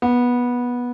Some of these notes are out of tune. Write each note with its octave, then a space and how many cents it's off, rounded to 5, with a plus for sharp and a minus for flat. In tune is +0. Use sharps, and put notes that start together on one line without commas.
B3 -15